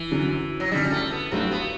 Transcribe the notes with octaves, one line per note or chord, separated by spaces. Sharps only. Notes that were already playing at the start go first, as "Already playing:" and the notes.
Already playing: E3
F#2 D3 F#3
F#3
F#2 D3 F#3 G3
A3
B3
G2 F#3 A3 C4 D4 F#4
B3